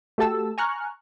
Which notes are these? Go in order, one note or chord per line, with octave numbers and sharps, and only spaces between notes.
A3 F#4 G4 A4 A5 E6
G#5 A#5 C#6 F6 F#6